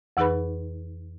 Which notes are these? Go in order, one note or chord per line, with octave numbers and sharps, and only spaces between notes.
F2 E3 D#4 G#4 B4 B5